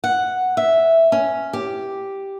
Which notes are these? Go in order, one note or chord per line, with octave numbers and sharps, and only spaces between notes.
F#5
E5
C#4
G4